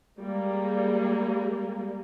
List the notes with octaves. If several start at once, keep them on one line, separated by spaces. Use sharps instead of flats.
G3 G#3 A#3